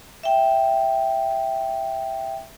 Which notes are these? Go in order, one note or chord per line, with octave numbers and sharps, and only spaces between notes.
E5 G5